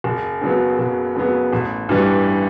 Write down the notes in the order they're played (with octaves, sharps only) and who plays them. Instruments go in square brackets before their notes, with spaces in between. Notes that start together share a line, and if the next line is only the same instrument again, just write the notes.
[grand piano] F#1
F#2 C#3 F#3 B3
F#1
F#2 C#3 F#3 B3
A1
G2 E3 G3